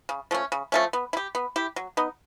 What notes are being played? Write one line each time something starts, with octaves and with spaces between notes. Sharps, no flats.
C#3
F3 A3 C#4
C#3
F3 A3 C#4
B3
E4
G4
B3
E4 G4
F#3
B3 D#4